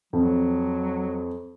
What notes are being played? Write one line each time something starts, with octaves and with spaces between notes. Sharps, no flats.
F2 F#3